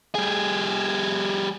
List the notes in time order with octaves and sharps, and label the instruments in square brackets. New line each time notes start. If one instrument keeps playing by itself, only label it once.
[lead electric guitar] G3 G#4